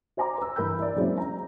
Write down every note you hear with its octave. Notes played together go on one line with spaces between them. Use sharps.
F#4 C5 G#5 A#5 C6 D6
B4 E6
G2 E3 A#4 B5 E6 G6
E4 D5
F#3 G#3 A#3 C4 C#4 E4
A#5